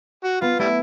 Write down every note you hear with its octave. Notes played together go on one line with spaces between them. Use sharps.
F#4
B3 F4
G3 A3 E4